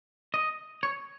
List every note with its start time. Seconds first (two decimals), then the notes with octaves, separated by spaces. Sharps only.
0.34 D#5
0.83 C#5